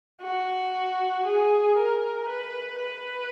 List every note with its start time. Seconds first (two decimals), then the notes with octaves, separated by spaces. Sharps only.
0.22 F#4
1.26 G#4
1.77 A#4
2.29 B4
2.81 B4